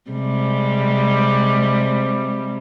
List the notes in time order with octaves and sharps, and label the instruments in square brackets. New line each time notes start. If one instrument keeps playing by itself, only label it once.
[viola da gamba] C3 G3 G#3